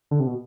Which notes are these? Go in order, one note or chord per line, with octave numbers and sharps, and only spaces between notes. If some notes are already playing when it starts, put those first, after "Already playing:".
D3
C3
B2